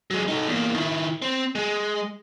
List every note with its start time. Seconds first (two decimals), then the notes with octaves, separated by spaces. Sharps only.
0.11 F#3 G#3
0.28 D#4 A4
0.47 E2 A#3
0.75 D#3 E4
1.22 C4
1.55 G#3